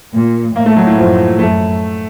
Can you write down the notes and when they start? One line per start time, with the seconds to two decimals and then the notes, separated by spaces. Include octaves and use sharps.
0.14 A#2
0.55 A2 A#3
0.66 A3
0.76 F#3
0.87 A2
0.98 F#2 F3
1.38 F#2 A3